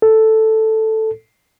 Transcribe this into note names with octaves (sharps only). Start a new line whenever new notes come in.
A4